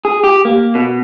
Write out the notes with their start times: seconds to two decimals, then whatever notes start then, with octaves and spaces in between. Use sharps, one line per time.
0.05 G#4
0.24 G4
0.45 A#3
0.75 B2